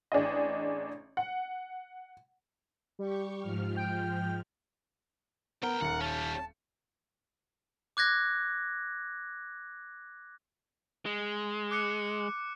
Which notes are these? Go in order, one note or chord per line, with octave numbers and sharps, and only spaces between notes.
A1 D4 G#4 D#5
F#5
G3 G4 C#6
G#2 F3 F6
G5
D2 B3 A#4 G5
D#1 F#5 C#7
C#4 G4 A5
D6 F#6 G#6 A#6
G#3
D6 F#6 C#7